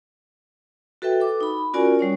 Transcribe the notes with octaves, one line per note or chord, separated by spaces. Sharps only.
F#4 A4 B4 E5 G5
A4 D6
D#4 B5
C#4 F4 F#4 A#4 D5 G#5
G3 C#4 C#5